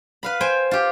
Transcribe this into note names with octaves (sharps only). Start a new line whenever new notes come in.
B4 F5 B5
C5 G5 G#5
F4 G4